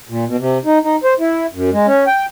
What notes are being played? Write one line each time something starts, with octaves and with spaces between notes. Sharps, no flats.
A#2
B2
C3
D#4
D#4
C5
E4
F#2
G#3
C#4
G5